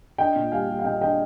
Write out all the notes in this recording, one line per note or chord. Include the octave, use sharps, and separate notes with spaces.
D4 D#5 G5
A#2
G3 F5 G#5
G3
F5
A#2 D#5 G5
D4 D#5 G5